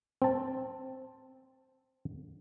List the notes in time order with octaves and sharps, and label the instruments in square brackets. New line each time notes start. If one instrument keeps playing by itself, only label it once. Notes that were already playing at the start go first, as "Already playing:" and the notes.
[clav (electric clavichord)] C4 A5